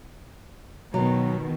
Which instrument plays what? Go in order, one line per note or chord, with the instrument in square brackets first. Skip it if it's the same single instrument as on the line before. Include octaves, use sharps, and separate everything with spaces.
[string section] B2 D#3 [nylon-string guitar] F#3